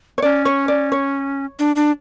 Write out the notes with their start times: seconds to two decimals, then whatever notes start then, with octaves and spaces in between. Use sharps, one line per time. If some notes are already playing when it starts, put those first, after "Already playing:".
0.18 C#5
0.22 C#4 D5
0.45 C#5
0.68 D5
0.92 C#5
1.59 D4
1.76 D4